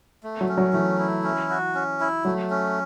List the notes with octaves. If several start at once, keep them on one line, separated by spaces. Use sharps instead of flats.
A3
F#3
C#4
F#3
E3 A3
E4
C#4
F#4
C#4
E4
F#3 A3
C#4